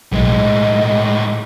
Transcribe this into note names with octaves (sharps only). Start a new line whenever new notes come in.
B1 A2 G#3 D#5